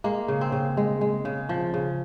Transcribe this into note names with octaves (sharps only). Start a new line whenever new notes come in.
G#3 A#3
C#3
C4
C#3
G#3
G#3
C#3
F3
C#3